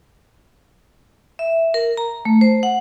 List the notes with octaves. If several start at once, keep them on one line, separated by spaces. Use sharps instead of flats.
E5
A#4
A#5
A3
C5
F#5